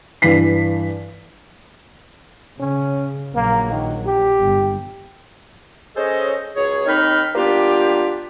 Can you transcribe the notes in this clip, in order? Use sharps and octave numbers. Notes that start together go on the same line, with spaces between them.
G2 E3 D4 B6 C7
C#3 C#4
A#1 F#3 A#3
D#3
G4
G1
C#4 G#4 A4 C5 C#5 D#5
C#2 F#3 G#4 C#5
D#2 D#3 C4 D#4 B5 F6
G3 A#3 B3 D4 F4 G4